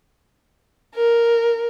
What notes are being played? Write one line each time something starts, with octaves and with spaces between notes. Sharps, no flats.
A#4